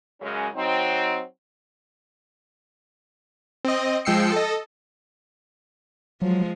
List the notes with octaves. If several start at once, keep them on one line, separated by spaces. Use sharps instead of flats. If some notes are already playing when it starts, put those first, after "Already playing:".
F#2 C#3 G#3 C#4
F#3 C4 D#4
C4 D#5
F3 G#3 G5 E6 C7 C#7
A4 D#5
F3 F#3 G#3